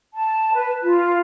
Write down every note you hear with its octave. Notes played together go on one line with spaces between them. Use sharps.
A5
B4
F4